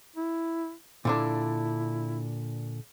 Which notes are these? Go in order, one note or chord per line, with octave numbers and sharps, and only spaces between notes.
E4
A#2 D3 D4 E4